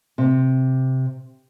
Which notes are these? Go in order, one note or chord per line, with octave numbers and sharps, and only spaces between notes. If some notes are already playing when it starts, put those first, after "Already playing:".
C3